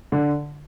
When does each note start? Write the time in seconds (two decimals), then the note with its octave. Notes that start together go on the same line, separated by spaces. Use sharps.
0.12 D3